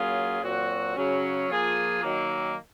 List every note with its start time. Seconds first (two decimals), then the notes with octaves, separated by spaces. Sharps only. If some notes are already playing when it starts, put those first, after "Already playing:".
Already playing: F#3 A#3 C#4 F4 G#4
0.41 A#2 F#3 C4 F#4
0.95 C#3 F#3 C#4
1.48 F3 A#3 F4 G#4
2.02 D#3 F#3 A#3